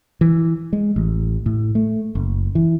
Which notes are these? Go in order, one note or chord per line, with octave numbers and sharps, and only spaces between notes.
E3
G#3
A1
A2
A3
F#1
E3